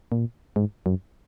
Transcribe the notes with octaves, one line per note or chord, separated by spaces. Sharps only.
A#2
G#2
F#2